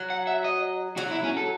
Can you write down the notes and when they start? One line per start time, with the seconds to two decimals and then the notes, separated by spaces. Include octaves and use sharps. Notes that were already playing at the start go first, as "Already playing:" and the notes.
Already playing: F#3
0.10 F#5
0.27 E5
0.44 D#5
0.97 F#3 F#4
1.11 E4
1.24 C#4
1.37 A4